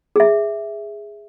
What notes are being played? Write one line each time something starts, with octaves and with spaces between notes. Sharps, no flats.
G#4 E5